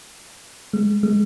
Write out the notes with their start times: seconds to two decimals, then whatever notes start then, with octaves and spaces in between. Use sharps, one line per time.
0.73 G#3
1.03 G#3